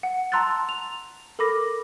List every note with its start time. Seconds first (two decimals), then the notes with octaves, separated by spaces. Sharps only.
0.03 F#5
0.32 A5 A#5 C6 E6 F#6 A6
0.69 F7
1.39 A4 A#4 B5 D6 A#6